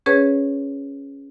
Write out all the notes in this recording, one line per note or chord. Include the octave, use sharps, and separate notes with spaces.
C#4 G#4 B4 C#5